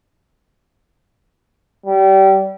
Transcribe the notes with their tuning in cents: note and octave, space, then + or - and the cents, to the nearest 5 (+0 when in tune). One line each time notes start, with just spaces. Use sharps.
G3 -25